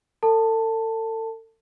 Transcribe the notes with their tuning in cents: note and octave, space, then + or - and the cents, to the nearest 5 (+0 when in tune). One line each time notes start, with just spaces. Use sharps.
A4 +35 A5 +10